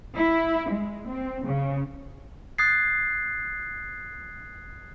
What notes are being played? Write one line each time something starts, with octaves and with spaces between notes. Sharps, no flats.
E4
G#3
C4
C#3
D#6 F#6 G#6 A6 C7